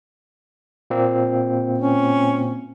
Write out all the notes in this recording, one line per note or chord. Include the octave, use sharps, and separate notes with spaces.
A#2 A#3 C4
C#4